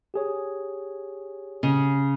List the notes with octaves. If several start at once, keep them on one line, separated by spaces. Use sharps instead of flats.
G4 G#4 C#5
C#3